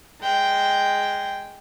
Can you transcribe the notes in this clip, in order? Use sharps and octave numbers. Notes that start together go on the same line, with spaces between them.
G#3 G5